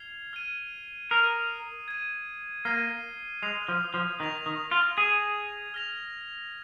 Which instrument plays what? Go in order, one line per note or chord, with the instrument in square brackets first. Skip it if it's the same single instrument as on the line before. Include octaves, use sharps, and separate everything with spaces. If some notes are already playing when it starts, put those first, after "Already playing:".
Already playing: [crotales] F6 G#6 C7 F7
F6 G#6 D#7
[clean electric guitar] A#4 [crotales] D#6 C7 D#7
[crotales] G#6 D#7
[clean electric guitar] A#3 [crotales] F6 C7 D#7
[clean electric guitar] G#3 [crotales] D#6 C7 F7
[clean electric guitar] F3
F3
[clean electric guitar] D#3 [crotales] D#6 A#6 F7
[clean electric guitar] D#3
F4
[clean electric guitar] G#4 [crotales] G#6 F7
[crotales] F6 A#6 F7